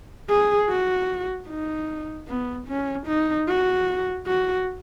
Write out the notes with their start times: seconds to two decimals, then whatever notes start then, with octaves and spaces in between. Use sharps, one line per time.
0.29 G#4
0.69 F#4
1.48 D#4
2.28 B3
2.68 C#4
3.07 D#4
3.48 F#4
4.27 F#4